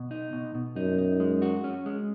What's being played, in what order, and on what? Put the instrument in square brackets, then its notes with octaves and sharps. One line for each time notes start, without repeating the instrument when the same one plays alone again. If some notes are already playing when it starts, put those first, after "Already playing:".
Already playing: [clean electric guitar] B2
D#4
B2
B2
[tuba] F#2 [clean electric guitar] D#4
[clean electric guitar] D#4
G#3
F#4
C#4
G#3